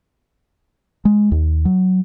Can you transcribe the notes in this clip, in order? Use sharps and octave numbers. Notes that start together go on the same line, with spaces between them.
G#3
D#2
F#3